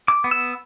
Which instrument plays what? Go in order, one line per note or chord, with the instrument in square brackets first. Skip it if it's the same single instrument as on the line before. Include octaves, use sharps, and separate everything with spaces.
[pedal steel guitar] D6
B3
E6